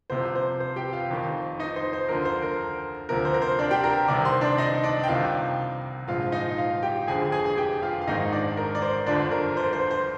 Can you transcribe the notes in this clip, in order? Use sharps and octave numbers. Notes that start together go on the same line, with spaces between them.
C2 C3 F3 C5
C5
C5
G4 G5
F4 F5
F1 F2 D#3
D#4 D#5
C5
C5
D2 D3 F3 A#4
C5
A#4
D2 C3 F3 A#4
C5
A#4
C5
D4 D5
G4 G5
A#4 A#5
C2 C3 D#3 D5 D6
C5 C6
D4 D5
D#4 D#5
D4 D5
G5
C2 C3 D#3 F4 F5
A#1 G#2 F3 F4 F5
D#4 D#5
F4 F5
G4 G5
F1 F2 D3 F3 G#4 G#5
G#4 G#5
G#4 G#5
G4 G5
F4 F5
F5
G#1 G#2 D#3 D#4 D#5
D4 D5
A#4
D5
C5
G1 F2 D3 F3 D4 D5
A#4
C5
C5
C5